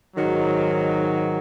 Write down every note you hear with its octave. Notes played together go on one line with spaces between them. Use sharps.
G#2 D#3 F#3